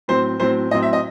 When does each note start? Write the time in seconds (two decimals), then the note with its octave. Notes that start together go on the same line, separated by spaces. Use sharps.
0.08 A2 F#3 C4 C5
0.40 A2 F#3 C4 C5
0.71 A2 F#3 C4 D#5
0.83 E5
0.93 D#5